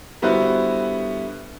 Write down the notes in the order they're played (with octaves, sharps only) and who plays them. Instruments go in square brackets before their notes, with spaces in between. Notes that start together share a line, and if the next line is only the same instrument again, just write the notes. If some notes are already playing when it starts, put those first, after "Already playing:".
[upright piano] D3 G3 B3 E4 F#4 C5